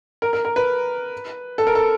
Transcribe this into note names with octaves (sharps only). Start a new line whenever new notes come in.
A#4
A#4
A#4
B4
A4
A#4
A4